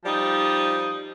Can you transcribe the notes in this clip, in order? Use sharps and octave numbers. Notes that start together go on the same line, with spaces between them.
F3 G3 D#4